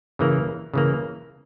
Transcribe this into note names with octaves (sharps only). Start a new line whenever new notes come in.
C#3 E3 A#3
C#3 E3 A#3